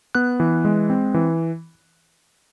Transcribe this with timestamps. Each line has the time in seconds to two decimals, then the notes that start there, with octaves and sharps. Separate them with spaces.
0.15 B3 F#6
0.40 E3
0.65 G#3
0.90 C4
1.14 E3